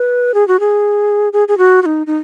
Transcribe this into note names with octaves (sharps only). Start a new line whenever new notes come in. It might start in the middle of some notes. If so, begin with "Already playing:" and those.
Already playing: B4
G#4
F#4
G#4
G#4
G#4
F#4
F#4
D#4
D#4